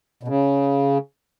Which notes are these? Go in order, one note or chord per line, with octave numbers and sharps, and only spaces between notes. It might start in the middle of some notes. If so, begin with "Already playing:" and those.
B2
C#3